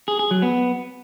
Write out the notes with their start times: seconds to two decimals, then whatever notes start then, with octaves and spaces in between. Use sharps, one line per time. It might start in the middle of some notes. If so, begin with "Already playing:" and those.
0.08 G#4
0.19 G#4
0.31 F#3
0.42 B3